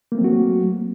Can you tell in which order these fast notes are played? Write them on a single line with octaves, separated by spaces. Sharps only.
A#3 A3 C4 F#3 F#4